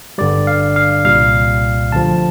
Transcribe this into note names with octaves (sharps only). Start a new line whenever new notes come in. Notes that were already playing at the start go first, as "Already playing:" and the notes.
G1 G2 D3 G3 D5
F5
F5
C2 A#2 G3 F5
D2 D3 F3 A5